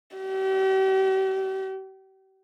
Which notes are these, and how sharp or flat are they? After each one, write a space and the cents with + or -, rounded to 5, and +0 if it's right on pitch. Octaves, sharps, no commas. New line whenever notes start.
G4 -40